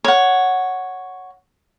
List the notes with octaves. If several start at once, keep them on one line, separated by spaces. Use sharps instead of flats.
C#5 F#5